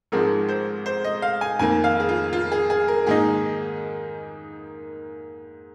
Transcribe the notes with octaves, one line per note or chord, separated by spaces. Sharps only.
G#1 G#2 F3 G#3 C4 A#4
C5
C5
D#5
F5
G#5
F2 D#3 A#3 G#5
F5
G#4
F4
F4
G#4
G#4
A#4
G#2 D#3 A#3 D#4 G#4